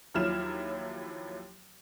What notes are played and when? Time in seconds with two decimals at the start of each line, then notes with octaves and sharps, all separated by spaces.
0.14 D#2 F3 F#3 E4 F6 E7